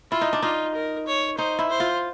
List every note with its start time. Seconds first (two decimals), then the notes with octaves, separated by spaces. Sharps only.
0.11 E4 F4
0.21 D#4
0.33 D4
0.43 D#4 F4
0.75 A#4
1.07 C#5
1.38 D#4 C5
1.59 E4
1.70 C5
1.80 F4